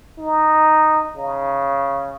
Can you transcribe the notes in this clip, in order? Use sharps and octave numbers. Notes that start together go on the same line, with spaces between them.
D#4
C#3